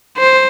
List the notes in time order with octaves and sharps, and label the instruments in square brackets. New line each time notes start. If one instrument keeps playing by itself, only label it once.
[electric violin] C5